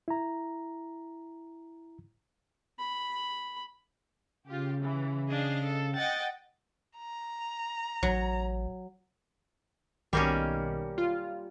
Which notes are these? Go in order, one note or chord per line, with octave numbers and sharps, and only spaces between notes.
E4 A#5
B5
C#3 F4 G4
E3
D4 G#4 D#5 F5
A4
D#5 F#5 G5 A6
A#5
A1 F#3
B1 D#3 G3 A#3 C#4
F4